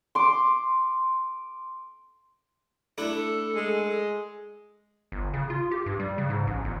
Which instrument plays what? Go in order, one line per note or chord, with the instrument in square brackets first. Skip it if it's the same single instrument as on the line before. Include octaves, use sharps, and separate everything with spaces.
[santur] C6 D6
[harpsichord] A3 D4 E4
[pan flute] A4
[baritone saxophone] G#3
[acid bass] G1
C#3
F4
G4
G2
G3
C#3
G#2
A1
G1